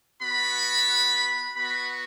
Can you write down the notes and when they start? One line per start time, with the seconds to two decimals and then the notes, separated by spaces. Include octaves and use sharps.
0.22 B3 F#4 B5
1.56 B3 F#4 B5